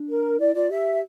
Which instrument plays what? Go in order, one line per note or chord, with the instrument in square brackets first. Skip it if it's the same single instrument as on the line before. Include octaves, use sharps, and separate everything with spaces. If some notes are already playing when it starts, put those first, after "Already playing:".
Already playing: [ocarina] D4
[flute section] A#4
[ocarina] E4 [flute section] D5
[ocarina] F4 [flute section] D5
[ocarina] G4 [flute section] E5